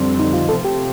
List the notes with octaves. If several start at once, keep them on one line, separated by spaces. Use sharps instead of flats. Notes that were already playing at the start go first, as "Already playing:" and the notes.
Already playing: F2 D3 G3 C4
D#4
F4
C3 F3 A3 C4 A4
G4